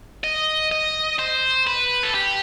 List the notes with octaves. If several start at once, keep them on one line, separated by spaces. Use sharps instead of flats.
D#5
D#5
C5
B4
A4
G4